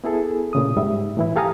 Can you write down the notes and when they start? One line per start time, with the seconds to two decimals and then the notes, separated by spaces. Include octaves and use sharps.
0.04 B3 E4 G#4 A4
0.53 A#2 C#3 D#6
0.77 G#2 G3 E5
1.17 A2 E3 E4
1.36 G4 A4 F5 G#5 A#5 D#6